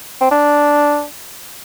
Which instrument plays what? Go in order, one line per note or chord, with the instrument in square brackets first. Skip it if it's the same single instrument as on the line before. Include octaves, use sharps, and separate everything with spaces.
[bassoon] C4
D4